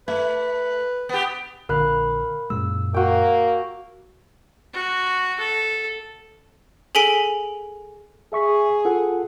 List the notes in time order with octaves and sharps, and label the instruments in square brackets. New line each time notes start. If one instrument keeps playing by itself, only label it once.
[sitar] A3 [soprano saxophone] B4 [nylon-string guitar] E5
[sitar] B3 G4
[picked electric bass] A#1 D3 [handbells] A#4 B5 F#6 [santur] F5
[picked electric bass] F#2 A#2 G#3 [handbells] E6
[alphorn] A#3 [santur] F#4 G5
[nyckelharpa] F#4
A4
[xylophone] G#4 A4 G#5 B6 D7 G7
[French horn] G#4 [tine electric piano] E5 C#6 B6
[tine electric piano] F4 A4 F#5